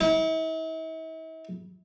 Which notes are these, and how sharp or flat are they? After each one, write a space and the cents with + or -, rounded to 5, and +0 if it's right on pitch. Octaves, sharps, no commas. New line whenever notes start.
E4 -45